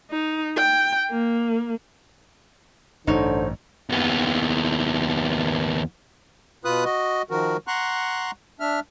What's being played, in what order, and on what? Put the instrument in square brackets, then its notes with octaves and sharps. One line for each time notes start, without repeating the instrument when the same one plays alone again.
[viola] D#4
G5
A#3
[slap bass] A1 G2 [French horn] D3 [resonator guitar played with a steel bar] D#4 C#5 [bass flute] C5
[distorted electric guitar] D#2 B3
[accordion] B2 F4 B4 D#6 F#6
F#4 D#5
D#3 F3 F#4 A#4
F#5 A#5 C6 C#6 F#6
D4 E5 F6